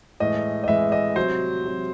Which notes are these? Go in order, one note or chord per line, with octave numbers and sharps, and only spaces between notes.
A2 E3 G#3 D#5
D#5
A2 E3 G#3 E5
D#5
C3 F#3 C5
C3 F#3